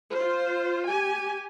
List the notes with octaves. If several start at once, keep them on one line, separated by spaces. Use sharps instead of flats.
F4 C5
G4 G#5